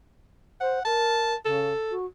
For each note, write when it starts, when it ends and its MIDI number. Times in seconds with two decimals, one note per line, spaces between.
0.61 0.79 72
0.61 0.83 78
0.85 1.34 70
0.85 1.36 81
1.45 1.73 49
1.45 1.94 69
1.91 2.05 66